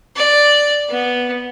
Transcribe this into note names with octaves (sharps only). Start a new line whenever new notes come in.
D5
B3